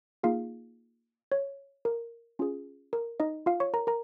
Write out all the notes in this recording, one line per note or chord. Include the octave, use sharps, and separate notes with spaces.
A#3 D#4 F4 G#4 F5
C#5
A#4
C#4 F4 G#4
A#4
D#4 D#5
F4 F5
C#5 C#6
A#4 A#5
A#4 A#5